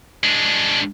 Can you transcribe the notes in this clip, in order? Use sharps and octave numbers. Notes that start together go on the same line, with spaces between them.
G#3 D4